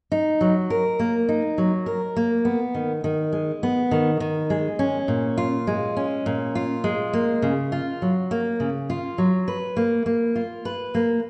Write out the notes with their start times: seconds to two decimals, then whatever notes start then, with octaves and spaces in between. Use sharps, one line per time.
0.12 D#4
0.41 F#3
0.70 A#4
0.99 A#3
1.29 D#4
1.58 F#3
1.86 A#4
2.16 A#3
2.45 B3
2.75 D#3
3.04 D#3
3.33 G#3
3.63 B3
3.91 D#3
4.20 D#3
4.50 G#3
4.79 C#4
5.08 A#2
5.38 F4
5.67 G#3
5.97 C#4
6.26 A#2
6.55 F4
6.84 G#3
7.13 A#3
7.42 C#3
7.72 F4
8.02 F#3
8.31 A#3
8.60 C#3
8.90 F4
9.18 F#3
9.48 B4
9.77 A#3
10.06 A#3
10.35 F4
10.65 B4
10.95 A#3